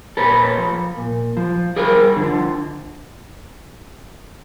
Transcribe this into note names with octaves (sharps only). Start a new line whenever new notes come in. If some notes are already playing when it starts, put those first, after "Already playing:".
A#2 A4 B4
F3
A#2
F3
G2 G#4 A#4
D3 F3